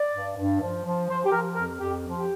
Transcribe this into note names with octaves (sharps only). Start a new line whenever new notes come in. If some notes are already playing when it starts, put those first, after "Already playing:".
Already playing: D5
G2
G2
F3
F3
F3 C5
G4
F3 A#4
F2 A#4
F2 G4
F3
G4